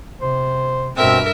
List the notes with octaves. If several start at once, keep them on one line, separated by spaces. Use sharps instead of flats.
C3 C5
G2 B2 C4 A#4 E5